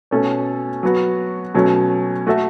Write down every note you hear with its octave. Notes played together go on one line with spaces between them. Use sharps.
B2 A3 C#4 A4 C#5
F#3 B3 F#4
B2 F#3 A3 C#4
A3 F#4 A4 E5